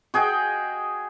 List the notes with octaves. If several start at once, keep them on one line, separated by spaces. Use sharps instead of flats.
F#4 G#4 D#5 G5